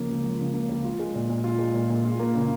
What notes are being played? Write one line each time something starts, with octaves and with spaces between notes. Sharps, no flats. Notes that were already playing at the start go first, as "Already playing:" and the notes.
Already playing: C#3 F3 A#3
C#2
F3
C#3
A#3
C#2
F4
G#3
A#2
A#2
F4
G#3
A#2
A#2
F4
A#3
C#3